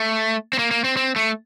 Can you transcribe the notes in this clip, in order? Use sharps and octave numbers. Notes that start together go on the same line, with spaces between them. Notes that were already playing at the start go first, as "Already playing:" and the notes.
Already playing: A3
C4
A#3
A#3
C4
C4
A3